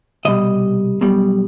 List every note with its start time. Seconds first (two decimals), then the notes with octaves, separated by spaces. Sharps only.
0.25 C2 B2 G3 D#5
1.01 B1 B2 G3